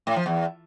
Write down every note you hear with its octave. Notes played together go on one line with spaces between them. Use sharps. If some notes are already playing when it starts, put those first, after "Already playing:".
A2
F3
E2